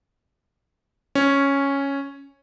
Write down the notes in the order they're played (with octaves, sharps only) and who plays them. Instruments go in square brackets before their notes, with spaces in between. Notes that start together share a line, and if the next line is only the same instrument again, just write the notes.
[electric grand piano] C#4